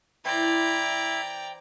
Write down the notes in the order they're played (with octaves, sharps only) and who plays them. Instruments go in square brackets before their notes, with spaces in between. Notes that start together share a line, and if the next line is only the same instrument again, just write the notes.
[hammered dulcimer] E3 C5 [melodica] E4 B5 [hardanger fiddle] D5 A#5 [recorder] G5